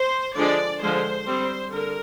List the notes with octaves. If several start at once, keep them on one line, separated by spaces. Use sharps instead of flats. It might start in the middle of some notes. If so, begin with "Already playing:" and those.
Already playing: C5
D3 F3 G#3 D4 D5
D3 F3 G#3 C5
G3 C4
D3 A#4